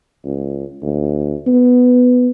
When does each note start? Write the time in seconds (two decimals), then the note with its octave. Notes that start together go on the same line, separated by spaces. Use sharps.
0.25 C#2
0.82 D2
1.47 B3